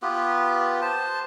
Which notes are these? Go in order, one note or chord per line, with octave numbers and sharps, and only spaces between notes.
B3 F4 G4 B4
C5 A5